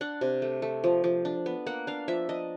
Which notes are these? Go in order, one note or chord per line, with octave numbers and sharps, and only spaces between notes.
D4 F#5
C3
A3
A3
F3
F3
D4
B3
A#3 F#5
D4 F5
F3 E5
D4 D#5